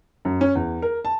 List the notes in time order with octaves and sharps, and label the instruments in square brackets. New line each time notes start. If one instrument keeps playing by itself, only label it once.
[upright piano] F#2
C#4
E2
A#4
A5